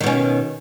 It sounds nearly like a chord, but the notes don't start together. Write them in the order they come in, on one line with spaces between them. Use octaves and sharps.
D#3 B2 C#4